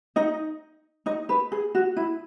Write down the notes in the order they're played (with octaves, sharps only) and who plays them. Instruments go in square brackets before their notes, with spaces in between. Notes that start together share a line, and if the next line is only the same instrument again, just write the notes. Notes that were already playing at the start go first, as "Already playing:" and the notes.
[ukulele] D#4 D#5
D#4 D#5
B4
G#4
F#4
E4